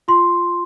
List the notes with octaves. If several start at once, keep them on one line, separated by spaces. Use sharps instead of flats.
F4 C6